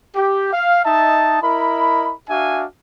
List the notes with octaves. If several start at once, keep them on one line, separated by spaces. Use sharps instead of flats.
G4
F5
D#4 D#5 E5 A5
E4 A#4 D#5 B5
D4 F#4 E5 F5 G#5